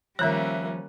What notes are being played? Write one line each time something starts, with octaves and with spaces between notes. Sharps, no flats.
D#3 F3 G3 A#3 C#4 C#5 E5 F#6